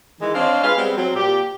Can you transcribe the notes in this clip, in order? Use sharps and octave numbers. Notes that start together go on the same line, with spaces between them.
D#3 E3 G#3 D#4
C4 D4 C5 C#5 D#5 F5
G#3 G#4 B4 F5
G3 G#3 B3 C4
F#3 C4
A#2 G4